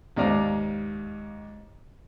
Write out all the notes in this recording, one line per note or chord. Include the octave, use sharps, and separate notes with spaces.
D#2 G#2 D5 F5 A#5